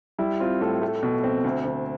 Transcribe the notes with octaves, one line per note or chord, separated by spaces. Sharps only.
G3 E4
C4 F4
A2 A4
A3
B2
C4
D2
D2